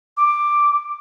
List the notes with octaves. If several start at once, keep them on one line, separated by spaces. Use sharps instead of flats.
D6